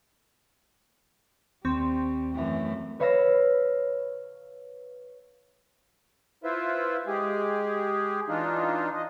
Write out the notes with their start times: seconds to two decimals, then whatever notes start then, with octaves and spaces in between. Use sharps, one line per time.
1.65 D#2 G3 C4 C#6
2.34 F#2 E3 A3
2.99 B4 C#5 F5 B5 E6 A#6
6.44 E4 F4 B4 C5 E5
7.07 G#3 G4 G#4
8.29 E3 D4 D#4 F4
8.94 D#5